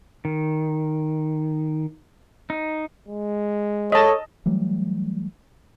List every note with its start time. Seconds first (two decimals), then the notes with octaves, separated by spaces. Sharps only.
0.25 D#3
2.50 D#4
3.08 G#3
3.92 A4 C#5 D#5 A5
4.46 E3 F#3 G3 A3